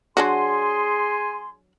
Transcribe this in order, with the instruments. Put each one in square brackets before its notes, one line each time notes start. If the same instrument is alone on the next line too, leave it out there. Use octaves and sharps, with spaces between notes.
[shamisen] F#3 D4 F#4 [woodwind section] G#4 G#5 C6